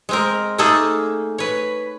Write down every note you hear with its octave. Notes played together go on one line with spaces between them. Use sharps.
G#3 C4 A#4
A3 A#3 D#4 G#4 A4
B4 C#5